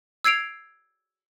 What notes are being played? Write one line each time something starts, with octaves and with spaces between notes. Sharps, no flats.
E6 G#6 C7 D7 F7